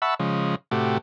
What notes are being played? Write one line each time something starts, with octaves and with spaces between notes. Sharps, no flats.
E5 F#5 A5 B5 C#6 E6
C#3 F3 G#3
A2 C3 A3 F#4 G4